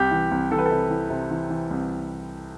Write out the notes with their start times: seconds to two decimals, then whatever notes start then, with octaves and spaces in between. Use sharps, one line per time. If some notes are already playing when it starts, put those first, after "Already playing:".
Already playing: C2 G4
0.11 E3
0.31 C2
0.51 E3 A4
0.59 B4
0.66 A4
0.71 C3
0.90 E3
1.10 C3
1.31 E3
1.50 E3
1.71 C2